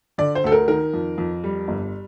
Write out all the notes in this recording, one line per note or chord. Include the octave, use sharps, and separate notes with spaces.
D3 D5
C5
D2 A4
A#4
D#3 A#4
F2
F2
G3
G1